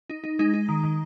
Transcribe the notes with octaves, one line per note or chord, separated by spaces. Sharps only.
D#4
D#4
G#3 D#4
D#4
D#3
D#3